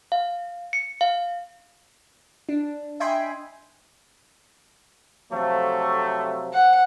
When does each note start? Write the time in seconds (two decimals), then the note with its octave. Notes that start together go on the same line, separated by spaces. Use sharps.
0.12 F5
0.73 C#7
1.01 F5
2.49 D4
3.00 D#5 E5 G5 G#5 B5 C6
5.32 C3 F3 F#3 A3 A4
6.53 F#5